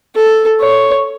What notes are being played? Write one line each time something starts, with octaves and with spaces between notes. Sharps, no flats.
A4
C#5